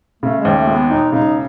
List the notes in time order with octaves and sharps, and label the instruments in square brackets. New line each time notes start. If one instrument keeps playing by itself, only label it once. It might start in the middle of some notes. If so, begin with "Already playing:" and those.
[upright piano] C#3 [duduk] A3
[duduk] G#3
[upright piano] D#2
[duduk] A3
[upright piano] G#3 [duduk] A3
[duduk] B3
[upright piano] E1 [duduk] D#4
[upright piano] C#3 [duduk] D#4